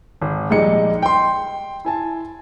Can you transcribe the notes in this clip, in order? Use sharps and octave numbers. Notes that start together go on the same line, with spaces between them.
G#1
A#1 G3 G#3 D#4 C#7
G5 C6
E4 G#5 A5